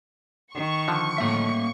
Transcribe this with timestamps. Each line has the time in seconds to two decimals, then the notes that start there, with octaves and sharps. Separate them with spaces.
0.55 D#3 C#6
0.88 D3 F3
1.18 A2 A#3 E5